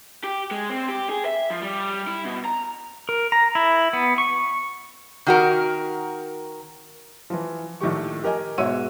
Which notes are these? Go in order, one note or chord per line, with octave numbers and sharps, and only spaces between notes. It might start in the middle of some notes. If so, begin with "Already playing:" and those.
G4
G#3
C4
G4
G#4
E5
F3
G3
E4
B2
A#5
A#4
A#5
E4
B3
C#6
D#3 F#4 A#4
E3 F3
A#1 A2 D#3 A3 G4 C#6
G4 A#4 D#5 G#5
G#2 B2 C#5 E5 E6 D#7